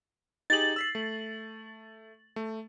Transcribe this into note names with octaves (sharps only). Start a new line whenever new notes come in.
D#4 G4 G#4 A6 F#7
E6 B6 C7
A3
A3